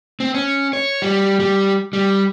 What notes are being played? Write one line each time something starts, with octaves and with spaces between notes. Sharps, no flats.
C4
C#4
C#5
G3
G3
G3